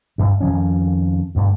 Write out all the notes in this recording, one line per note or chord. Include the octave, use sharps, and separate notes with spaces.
D2 G2
F2 D#3 F3 C#4
D2 G2 A3